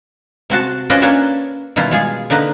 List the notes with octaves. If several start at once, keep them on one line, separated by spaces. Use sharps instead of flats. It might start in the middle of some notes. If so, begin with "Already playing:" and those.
C3 C4 F#4 A5
C#4 F4 B4 C5 D5 D#5
A#3 C#4 D4 B4 C#5 E5
B2 D#3 G3 E4 F4
G#3 F4 G#4
D3 A#3 D#4 B4